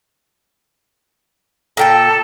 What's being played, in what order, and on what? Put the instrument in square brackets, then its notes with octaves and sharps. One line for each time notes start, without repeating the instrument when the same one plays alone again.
[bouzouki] A#2 G5 A5 [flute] A4